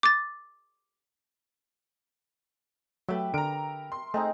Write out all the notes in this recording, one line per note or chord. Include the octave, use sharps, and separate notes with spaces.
D6 A6
F#3 A3 G4 B4 E5
D3 A#4 A#5 D7
C6
G#3 A3 C4 D#4 A#5